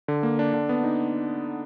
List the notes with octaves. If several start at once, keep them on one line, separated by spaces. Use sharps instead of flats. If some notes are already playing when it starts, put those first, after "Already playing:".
D3
A#3
D4
D3
B3
D#4